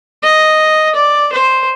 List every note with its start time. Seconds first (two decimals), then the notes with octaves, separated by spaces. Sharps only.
0.23 D#5
0.95 D5
1.33 C5